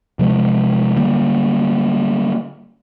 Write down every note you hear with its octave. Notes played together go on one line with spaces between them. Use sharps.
C3 F3 G#3
D3 G3 A#3